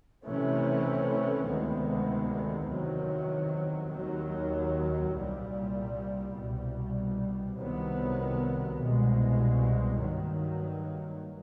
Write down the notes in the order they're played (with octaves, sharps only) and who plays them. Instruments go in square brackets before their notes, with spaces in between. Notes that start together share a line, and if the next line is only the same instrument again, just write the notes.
[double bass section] C3 E3 A3 C#4
D2 C3 D#3 G#3 B3
E2 C3 D#3 F#3
D#2 D#3 F#3
C2 A#2 G3
C2 B2 G3
C2 C3 D#3 F#3 B3
C2 B2 G#3
G2 D#3 F#3 A#3